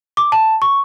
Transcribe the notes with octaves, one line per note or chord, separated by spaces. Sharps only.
D6
A5
C#6